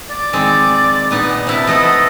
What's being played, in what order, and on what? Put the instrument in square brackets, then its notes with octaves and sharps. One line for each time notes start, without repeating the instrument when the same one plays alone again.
[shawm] D5
[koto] D#3 G#3 C4
A#2 B3 D#4
C3 E4 A5
[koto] A3 B3 A4 [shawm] D#5